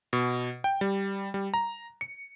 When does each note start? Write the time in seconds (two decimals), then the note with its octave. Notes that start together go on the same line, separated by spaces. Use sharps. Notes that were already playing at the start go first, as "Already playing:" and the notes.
0.13 B2
0.64 G5
0.81 G3
1.34 G3
1.54 A#5
2.01 C#7